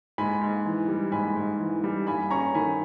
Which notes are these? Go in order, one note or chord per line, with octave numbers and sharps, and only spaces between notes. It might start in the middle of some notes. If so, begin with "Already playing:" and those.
G#2 G#5 B5
G#2
E3
G3
G#2 G#5 B5
G#2
E3
G3
G2 G#5 B5
C#4 A#5 C#6
D#3 G#5 B5